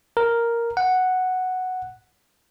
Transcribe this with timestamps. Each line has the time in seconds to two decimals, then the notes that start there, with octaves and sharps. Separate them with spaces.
0.17 A#4
0.77 F#5